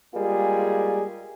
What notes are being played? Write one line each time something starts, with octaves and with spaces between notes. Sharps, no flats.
G3 G#3 A#3 F4 G#4